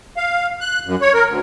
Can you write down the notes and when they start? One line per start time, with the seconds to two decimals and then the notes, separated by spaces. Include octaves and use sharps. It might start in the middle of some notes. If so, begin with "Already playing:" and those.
0.17 F5
0.61 F#6
0.86 F#2
1.02 C#5
1.14 A#4
1.28 D2